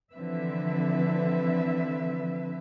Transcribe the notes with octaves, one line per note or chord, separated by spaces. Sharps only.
D3 E3 F3 C4 B4 E5